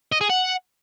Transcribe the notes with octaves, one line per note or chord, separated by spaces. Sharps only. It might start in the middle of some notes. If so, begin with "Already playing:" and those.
D#5
G#4
F#5